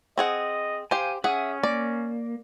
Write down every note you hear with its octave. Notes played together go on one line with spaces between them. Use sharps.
C4 G#4 D#5 F#5
G4 C5 F5 G#5
C#4 G#4 E5 F#5 D#6
A#3 D5